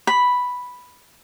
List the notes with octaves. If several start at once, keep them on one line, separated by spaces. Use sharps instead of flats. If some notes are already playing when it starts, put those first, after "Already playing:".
B5